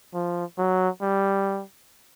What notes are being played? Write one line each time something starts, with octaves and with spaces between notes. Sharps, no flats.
F3
F#3
G3